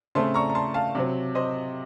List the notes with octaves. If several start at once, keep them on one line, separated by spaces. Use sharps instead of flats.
C#3 A3 C4 A5 C6
A#5 C#6
A#5
A5 C6
F5 A5
C3 F#3 C4
C5 D#5